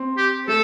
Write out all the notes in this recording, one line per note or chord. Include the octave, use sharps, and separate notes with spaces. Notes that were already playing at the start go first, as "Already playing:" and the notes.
Already playing: C4
G4
A3 A4